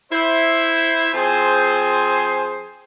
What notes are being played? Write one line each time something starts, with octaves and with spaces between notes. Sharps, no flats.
E4 C5
F3 C4 G#4 C5